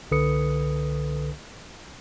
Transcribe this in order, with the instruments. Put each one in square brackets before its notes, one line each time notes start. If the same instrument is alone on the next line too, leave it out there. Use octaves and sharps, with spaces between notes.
[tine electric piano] C2 D3 A4 B4 D#6 C#7